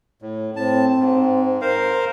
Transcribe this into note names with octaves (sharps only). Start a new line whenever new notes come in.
A2
A2 C4 A5
G#2
A#4 C5 F5